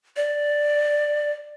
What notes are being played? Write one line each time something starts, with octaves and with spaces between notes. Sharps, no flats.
D5